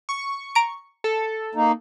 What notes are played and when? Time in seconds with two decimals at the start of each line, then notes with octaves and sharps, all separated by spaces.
0.09 C#6
0.55 A#5 D7
1.04 A4
1.55 A#3 D#4